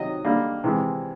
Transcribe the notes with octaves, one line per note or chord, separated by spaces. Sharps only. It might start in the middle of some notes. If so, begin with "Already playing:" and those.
Already playing: C3 D#3 F#3 D#5
D3 G3 A#3
C3 E3 G#3